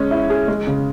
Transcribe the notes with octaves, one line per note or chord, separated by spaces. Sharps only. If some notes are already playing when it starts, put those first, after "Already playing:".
Already playing: G#3 C#4
E4
G#4
G#3
C#3